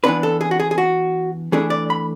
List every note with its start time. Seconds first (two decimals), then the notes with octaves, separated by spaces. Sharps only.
0.04 E3 B3 D4 B4
0.23 A4
0.41 G#4
0.51 F#4
0.60 G#4
0.71 G#4
0.78 F#4
1.52 E3 A3 D4 G#4
1.70 D5
1.90 B5